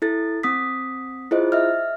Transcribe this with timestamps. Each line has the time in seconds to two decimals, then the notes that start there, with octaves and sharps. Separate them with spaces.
0.02 E4 A4 A6
0.43 C4 D#6 B6
1.31 E4 F4 G#4 C5 D#5
1.52 D#5 E5 F6